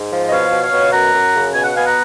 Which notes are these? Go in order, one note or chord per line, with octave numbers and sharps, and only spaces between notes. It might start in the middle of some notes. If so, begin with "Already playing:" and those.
Already playing: G#2
F3
D#5
B2 C#5 F5
B2
C#5 F5
B2
F#2 F#5 A#5
F#2
C#3
B2 G#5
F#5
B3 F5 G#5
F#5 A#5